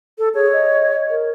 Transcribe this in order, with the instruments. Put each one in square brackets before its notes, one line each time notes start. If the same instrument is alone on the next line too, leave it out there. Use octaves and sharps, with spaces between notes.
[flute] A4
[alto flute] G#4 [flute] C#5
[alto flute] D#5
A#4